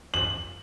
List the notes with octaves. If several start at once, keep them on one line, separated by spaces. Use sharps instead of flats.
F#7